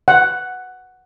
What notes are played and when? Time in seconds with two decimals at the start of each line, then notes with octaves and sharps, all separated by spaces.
0.08 F#5